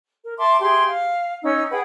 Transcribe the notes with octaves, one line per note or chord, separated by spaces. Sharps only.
A#4
E5 A5 C6 D6
G4 G#4 E5 C6
F5
C#4 D#4 E6
G#4 B4 F#5 G5